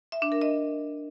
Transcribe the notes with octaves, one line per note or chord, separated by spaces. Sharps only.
E5
D4
A#4
D#5